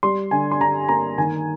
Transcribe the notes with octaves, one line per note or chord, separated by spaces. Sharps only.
G3 C6
D3 G#5
C6
D3 A#5
A#3 A#5
D#3 G#5